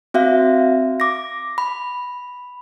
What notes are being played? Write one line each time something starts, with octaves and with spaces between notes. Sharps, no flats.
C4 F#4 E5 F5
D6 A#6
B5